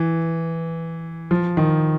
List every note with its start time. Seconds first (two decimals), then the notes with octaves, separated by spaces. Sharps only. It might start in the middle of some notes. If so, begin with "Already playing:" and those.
Already playing: E3
1.31 F3
1.57 D#3